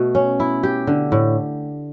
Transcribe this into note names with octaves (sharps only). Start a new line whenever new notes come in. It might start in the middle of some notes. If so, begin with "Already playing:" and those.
Already playing: B2 A3
C#4
E4
G4
D3
A2